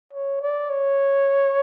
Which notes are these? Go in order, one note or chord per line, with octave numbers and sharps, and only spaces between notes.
C#5
D5
C#5